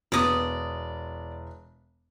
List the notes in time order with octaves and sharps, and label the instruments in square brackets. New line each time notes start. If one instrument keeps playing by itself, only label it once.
[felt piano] E1 B3 [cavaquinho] D5 D#6